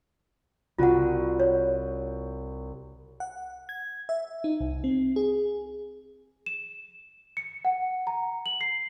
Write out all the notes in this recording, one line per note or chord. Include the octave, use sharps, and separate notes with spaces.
C2 F4 F#4 F#5 D#7
C#5
F#5
G#6
E5
D#4
C2
C4
G#4
E7
C#7
F#5
A#5
F#7
C7